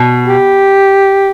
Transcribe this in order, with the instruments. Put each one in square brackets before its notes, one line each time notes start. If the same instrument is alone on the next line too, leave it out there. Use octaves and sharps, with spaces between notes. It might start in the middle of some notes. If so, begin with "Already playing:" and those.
Already playing: [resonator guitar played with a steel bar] B2
[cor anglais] G4